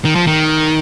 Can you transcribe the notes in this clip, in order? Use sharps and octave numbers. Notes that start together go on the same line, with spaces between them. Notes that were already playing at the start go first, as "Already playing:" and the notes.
D#3
F3
D#3